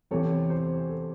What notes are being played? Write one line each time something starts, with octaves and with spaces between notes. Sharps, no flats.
E2 C3 E3 C4 A4 C#5
C5
A4